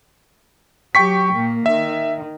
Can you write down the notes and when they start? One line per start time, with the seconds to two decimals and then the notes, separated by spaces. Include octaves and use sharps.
0.95 F#3 G4 G5 C#6 B6
1.33 A#2 A#3
1.66 D#3 E5